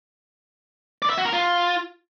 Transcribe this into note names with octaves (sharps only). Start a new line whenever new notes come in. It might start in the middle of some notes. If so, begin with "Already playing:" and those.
D5
E5
F#4
A#4
F4